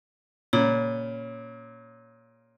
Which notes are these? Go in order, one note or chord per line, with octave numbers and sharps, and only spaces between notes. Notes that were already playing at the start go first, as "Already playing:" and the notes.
A#2 C#3 C#5 B5